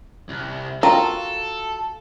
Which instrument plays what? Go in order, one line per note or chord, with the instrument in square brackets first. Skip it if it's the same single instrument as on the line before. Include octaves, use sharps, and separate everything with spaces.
[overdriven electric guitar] C2
[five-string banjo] F4 F#4 A#4 [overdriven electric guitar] A4 [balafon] G5 A#5